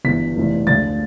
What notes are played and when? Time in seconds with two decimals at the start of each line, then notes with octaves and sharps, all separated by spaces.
0.04 G1 G2 E3 B6
0.36 F1 F2 E3
0.67 D2 D3 F3 A6